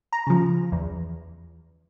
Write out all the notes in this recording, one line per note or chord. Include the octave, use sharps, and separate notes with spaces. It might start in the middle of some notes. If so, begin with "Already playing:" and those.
A#5
C#3 F3
E2